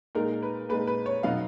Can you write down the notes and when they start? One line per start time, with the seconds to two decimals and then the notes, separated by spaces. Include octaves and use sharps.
0.15 A#2 G#3 D#4 A#4
0.43 B4
0.69 A#2 G#3 D#4 B4
0.87 B4
1.06 C#5
1.23 B2 F#3 B3 D#4 F5